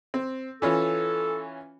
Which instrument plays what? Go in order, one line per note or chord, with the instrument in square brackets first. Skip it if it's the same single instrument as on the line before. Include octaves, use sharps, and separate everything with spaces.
[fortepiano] C4
[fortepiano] E3 C#4 F4 [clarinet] A4